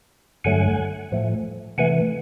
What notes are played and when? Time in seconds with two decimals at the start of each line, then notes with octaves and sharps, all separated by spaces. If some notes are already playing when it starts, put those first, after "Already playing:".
0.44 G2 D3 F#3 A3 F#5 G#5
1.12 A2 F3 A3
1.78 C3 E3 A3 F#5 G#5